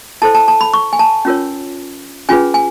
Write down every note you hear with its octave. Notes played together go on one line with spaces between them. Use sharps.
E4 A4 C5 A5
A5
A5
B5
C#6
G#5
A5
C#4 F4 A#4 C#5
C#4 F4 G#4 B4 G#5
G#5